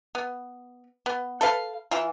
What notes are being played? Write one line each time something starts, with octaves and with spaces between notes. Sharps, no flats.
B3
B3
A4 B4 F5
E3 F4